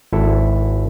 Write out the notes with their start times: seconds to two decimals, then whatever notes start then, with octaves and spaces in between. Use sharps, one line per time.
0.12 G#1 E4 A4